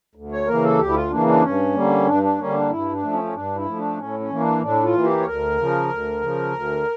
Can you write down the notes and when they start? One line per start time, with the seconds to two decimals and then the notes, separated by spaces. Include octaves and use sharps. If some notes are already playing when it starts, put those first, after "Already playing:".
0.15 D2
0.32 C#5
0.47 C#3 E3 A#3 A#4
0.64 A4
0.78 D2 G4
0.89 E4
0.94 F4
1.10 C#3 E3 A#3 D4
1.27 D4
1.42 G2 C#4
1.75 D3 G3 A#3
2.06 G2 D4
2.23 D4
2.38 D3 G3 A#3 C#4
2.54 D4
2.70 G2 E4
2.92 D4
3.02 F3 A3
3.13 C#4
3.24 C#4
3.34 G2 D4
3.56 E4
3.66 F3 A3
3.77 D4
3.97 A2 C#4
4.20 C#4
4.30 E3 A#3
4.40 D4
4.62 A2 D4
4.83 F4
4.93 E3 A#3
5.04 G4
5.21 C#5
5.25 D2 A#4
5.57 C#3 F3
5.90 D2
6.21 C#3 F3
6.52 D2